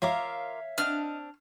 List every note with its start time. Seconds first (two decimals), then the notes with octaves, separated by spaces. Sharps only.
0.02 F4 A#4 C#5 E5 F5 D6
0.78 C4 D4 D#5 F#5 A5 F6